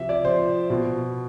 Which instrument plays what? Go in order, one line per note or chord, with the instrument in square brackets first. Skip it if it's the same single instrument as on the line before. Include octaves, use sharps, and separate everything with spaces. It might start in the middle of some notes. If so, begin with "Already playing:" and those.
Already playing: [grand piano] C3 F3 E5
D5
C3 F3 C5
B2